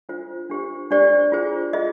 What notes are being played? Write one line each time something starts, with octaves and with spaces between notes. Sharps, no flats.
D4 F4 C5
D4 G4 C5
D4 G4 C5 D5
F4 G#4 C5
F4 G#4 C5 D#5